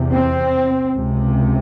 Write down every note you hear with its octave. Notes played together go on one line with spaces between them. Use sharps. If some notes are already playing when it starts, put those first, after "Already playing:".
Already playing: E2 C3
C4
C#2 C3